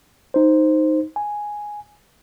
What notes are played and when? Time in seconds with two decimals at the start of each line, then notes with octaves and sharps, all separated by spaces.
0.34 D#4 C5
1.16 G#5